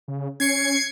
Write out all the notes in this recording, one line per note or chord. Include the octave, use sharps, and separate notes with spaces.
C#3
C#4 G#6 C7 C#7